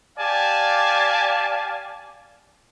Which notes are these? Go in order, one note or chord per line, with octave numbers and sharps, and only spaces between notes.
G4 D5 F5 G#5 A5